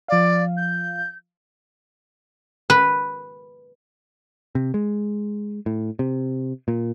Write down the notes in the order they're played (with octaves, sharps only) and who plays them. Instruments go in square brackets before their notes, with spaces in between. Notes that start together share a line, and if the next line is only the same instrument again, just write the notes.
[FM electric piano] F3 F5 [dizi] D5
[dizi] G6
[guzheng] B4
[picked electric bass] C3
G#3
A2
C3
A#2